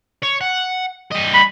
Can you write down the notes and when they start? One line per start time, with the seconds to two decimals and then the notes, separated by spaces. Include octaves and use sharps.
0.22 C#5
0.41 F#5
1.11 G3 D#5
1.34 B5